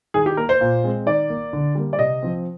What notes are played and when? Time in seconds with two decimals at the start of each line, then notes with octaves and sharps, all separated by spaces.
0.14 D#3 G#4
0.26 G4
0.37 A#3 A#4
0.49 C5
0.61 A#2
0.84 G#3 C4
1.06 D#3 D5
1.30 A#3
1.53 D3
1.75 G3 A#3
1.93 D5
1.99 C3 D#5
2.22 F3 C4